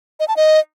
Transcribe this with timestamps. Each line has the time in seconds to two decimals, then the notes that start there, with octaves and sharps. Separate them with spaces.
0.20 D#5
0.28 A5
0.37 D#5